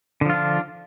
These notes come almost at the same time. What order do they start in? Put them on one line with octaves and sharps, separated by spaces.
D3 F3 F4 D4